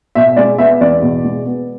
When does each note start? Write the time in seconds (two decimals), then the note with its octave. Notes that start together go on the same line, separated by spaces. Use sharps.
0.15 B2 E5
0.36 G#3 D5
0.58 B3 E5
0.81 E2 D5
1.02 B2
1.24 G#3
1.47 B3